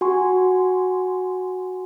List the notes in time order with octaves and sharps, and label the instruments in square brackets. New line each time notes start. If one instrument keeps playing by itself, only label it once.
[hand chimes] F#4 G#5 C6 C#6